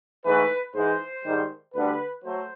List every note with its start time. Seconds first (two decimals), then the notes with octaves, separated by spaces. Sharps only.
0.24 G#2 E3 A3 B4
0.74 G#2 E3 G#3 C5
1.25 G#2 D#3 G3
1.74 D2 D3 G3 B4
2.24 F#3 A3 C5